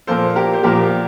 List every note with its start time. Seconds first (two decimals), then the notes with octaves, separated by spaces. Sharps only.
0.07 A#2 F3 A#3 A4 C5
0.36 G4 A#4
0.54 C5
0.63 A#2 F3 A#3 G4 A#4